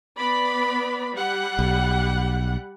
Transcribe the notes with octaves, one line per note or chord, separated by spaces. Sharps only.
B3 D5 B5
G3 F#5
B1